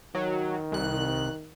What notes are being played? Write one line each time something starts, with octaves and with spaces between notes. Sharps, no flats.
D#3 F#3
C2 F#6